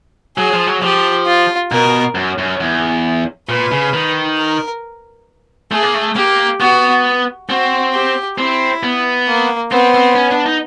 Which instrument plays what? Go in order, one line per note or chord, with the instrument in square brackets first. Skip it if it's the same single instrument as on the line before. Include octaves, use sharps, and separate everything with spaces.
[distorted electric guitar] F#3 [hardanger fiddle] G#4
[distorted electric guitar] F3
F#3
[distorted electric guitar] F3 [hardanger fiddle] G4
[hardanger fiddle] F4
[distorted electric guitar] B2 [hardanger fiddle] A#4
[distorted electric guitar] F#2
F#2
E2
[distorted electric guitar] A#2 [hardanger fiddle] B4
[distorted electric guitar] C#3
D#3
[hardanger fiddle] A#4
[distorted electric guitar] A3 [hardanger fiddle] G#4
[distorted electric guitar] A#3
A3
[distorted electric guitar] A#3 [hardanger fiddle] G4
[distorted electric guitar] B3 [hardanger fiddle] F#4
[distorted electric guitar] C4 [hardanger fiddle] F#4
[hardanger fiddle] G4
[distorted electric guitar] C4 [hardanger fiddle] E4
[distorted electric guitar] B3
[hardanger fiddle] A#3
[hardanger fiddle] B3 [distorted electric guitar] C4
[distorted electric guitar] C4
C#4
D4
D#4